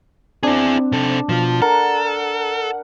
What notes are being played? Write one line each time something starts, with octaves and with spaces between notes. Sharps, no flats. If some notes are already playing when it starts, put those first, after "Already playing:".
C4 D4 E4 G#4
C3 A4
B2 F3 F4
A4 A#4 F#5